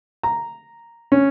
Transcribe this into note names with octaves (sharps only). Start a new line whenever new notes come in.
A#5
C#4